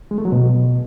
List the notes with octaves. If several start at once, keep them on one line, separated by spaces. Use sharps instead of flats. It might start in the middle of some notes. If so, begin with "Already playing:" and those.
G#3
A3
F#3
B2